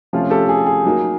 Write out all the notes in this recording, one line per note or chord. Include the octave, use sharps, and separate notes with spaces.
C3 F3 A3 C#4 F4
G4 A4
G#4
G#4
F#3 A#3 D#4